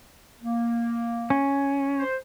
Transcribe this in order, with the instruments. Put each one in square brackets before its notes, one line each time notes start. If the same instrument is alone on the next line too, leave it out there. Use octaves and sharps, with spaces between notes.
[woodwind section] A#3
[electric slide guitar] C#4
[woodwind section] C5